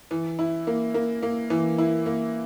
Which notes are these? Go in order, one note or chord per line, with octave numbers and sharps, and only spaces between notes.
E3
E4
A#3
A#3
A#3
E3
E4
A#3